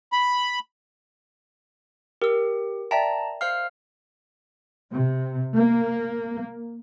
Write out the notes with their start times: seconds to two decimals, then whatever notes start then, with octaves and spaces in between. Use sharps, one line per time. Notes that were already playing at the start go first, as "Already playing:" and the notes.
0.13 B5
2.22 G4 A#4 E6
2.91 D5 E5 G5 A5 A#5
3.41 C5 F5 F6 C7
4.91 C3
5.54 A#3